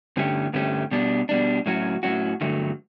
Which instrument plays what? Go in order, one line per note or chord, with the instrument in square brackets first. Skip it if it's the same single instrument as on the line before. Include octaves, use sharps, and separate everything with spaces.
[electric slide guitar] G2 D3 A3 C#4 G4
G2 D3 A3 C#4 G4
B2 G3 D4
B2 G3 D4
A2 F#3 C#4 F#4
A2 F#3 C#4 F#4
G2 D3 F#3 A3